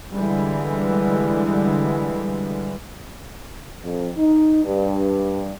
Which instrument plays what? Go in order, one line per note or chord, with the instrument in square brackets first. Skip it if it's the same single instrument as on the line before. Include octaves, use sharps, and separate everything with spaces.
[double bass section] D3 E3 G3 G#3
[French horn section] F2
D#4
G2